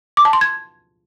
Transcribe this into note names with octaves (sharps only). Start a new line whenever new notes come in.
D6
A5
C6
G#6